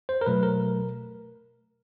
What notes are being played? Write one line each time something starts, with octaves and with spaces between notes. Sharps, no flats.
C5
A#4
B2 F#3 A3 B4
A#4